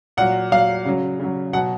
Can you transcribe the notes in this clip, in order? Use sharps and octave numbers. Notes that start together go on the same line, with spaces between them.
A#2 F#3 F#5
A#2 F#3 F5
C#3 F#3
C#3 F#3
B2 F#3 F#5